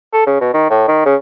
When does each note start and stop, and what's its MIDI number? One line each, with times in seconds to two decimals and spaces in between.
0.13 0.23 69
0.26 0.40 49
0.41 0.49 47
0.54 0.69 51
0.70 0.87 45
0.88 1.01 51
1.06 1.15 49